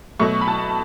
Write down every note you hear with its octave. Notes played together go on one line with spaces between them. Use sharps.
B2 F#3 A3 C#6
B5
A5